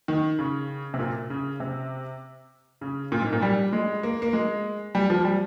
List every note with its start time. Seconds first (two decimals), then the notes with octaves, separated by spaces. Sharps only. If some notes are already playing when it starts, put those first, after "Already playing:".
0.08 D#3
0.39 C#3
0.94 C3
0.99 A#2
1.30 C#3
1.60 C3
2.81 C#3
3.12 A#2
3.22 G#2
3.33 A#2
3.42 G3
3.73 G#3
4.03 A#3
4.22 A#3
4.33 G#3
4.95 G3
5.10 F3
5.25 G3